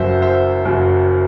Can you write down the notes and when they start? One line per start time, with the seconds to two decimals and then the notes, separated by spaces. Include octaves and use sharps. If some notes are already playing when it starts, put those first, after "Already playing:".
Already playing: F#1 F#2 F#3 C5 E5
0.22 C5 E5
0.65 F#1 F#2 F#3